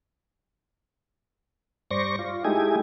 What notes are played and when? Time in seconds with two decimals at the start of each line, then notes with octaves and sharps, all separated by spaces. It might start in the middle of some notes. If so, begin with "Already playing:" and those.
1.91 G2 C5 D5 C#6 A#6
2.19 F4
2.44 G#3 A3 D#4 E4 G4 G#5